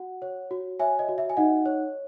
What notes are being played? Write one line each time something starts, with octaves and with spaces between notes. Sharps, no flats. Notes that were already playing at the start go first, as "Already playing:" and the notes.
Already playing: F#4 F#5
C#5
F#4
C#5 E5 G#5
D#5
F#4
E5
G#5
D#4 D#5 F#5
C#5